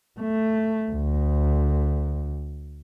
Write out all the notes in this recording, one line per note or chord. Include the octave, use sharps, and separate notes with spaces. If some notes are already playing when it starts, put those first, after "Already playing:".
A3
D2